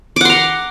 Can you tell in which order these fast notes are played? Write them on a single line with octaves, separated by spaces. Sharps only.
D6 F#5 C6 A#5